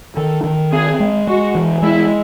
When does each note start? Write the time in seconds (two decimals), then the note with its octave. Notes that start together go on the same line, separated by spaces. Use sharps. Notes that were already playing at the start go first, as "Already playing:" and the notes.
0.16 D#3 A4
0.44 D#3
0.72 C4 G#4
1.00 G#3
1.27 G#3 F#4
1.55 E3
1.82 G#3 E4